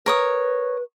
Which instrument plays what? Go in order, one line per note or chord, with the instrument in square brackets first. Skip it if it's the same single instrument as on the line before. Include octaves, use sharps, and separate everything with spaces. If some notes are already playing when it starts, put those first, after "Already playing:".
[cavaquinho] A#4 C#5 D#6 [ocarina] B4